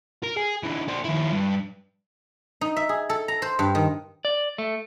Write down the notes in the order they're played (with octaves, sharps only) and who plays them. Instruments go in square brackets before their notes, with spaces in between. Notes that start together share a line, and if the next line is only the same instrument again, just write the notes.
[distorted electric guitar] A#4
G#4
D3 E3
D4 C5
D#2 E4
G2
[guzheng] D#4
E5
G#4
A4
A#5
C5
G2
D#3
[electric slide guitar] D5
A3